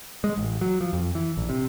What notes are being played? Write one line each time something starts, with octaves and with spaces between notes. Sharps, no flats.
G#3
A1
F#3
F3
F2
E3
A#1
C3